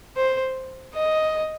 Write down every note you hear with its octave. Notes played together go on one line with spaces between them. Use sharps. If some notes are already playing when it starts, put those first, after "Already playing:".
C5
D#5